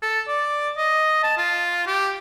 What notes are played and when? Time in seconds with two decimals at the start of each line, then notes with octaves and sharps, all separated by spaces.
0.02 A4
0.28 D5
0.77 D#5
1.23 A5
1.37 F4
1.87 G4